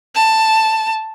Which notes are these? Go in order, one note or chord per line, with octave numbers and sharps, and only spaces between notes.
A5